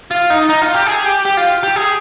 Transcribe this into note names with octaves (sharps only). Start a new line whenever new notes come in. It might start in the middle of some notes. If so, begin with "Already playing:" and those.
F4
D#4
D#4
F4
G4
G#4
G4
G4
F4
G4
G#4